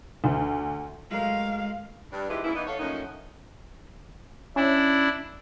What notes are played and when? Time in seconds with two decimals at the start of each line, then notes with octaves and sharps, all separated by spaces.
0.24 D2
1.11 F#3 G#3 A3 A#4 F5
2.12 G2 D4
2.29 G#2 F3 G#3 E4 G4 B4
2.43 G#2 C#3 A#3 E4
2.55 E3 B3 D#4
2.67 A4 C#5 F5
2.79 F3 F#3 A3 A#3 C#4 D#4
4.56 C#4 D4 E4